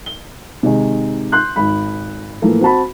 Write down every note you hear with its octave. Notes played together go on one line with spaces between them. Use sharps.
G7
C3 D#3 G#3 D#4
C6 F#6 G6
G#1 B5
A2 E3 F3 A#3 A4
C4 F#4 A5 B5